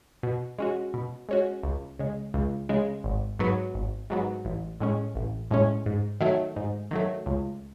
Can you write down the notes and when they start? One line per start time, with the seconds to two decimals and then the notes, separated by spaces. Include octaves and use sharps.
0.23 B2
0.58 G#3 C#4 F#4
0.94 B2
1.29 G#3 C#4 F#4
1.63 C#2
1.99 C#3 G#3
2.34 C#2
2.69 C#3 G#3
3.04 G#1
3.39 G#2 F#3 B3
3.75 G#1
4.10 G#2 F#3 B3
4.45 A1
4.80 A2 G#3 C#4
5.15 A1
5.51 A2 G#3 C#4
5.86 G#2
6.21 D#3 F#3 A3
6.56 G#2
6.91 D#3 F#3 A3
7.26 C#2